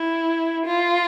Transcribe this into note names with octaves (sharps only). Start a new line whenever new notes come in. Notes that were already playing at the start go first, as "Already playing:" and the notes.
Already playing: E4
F4